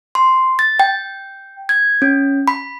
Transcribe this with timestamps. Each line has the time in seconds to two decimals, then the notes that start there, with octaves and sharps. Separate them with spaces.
0.15 C6
0.59 A6
0.80 G5
1.69 G#6
2.02 C#4
2.48 B5